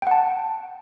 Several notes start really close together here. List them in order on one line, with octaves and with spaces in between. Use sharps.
G5 F#5 A5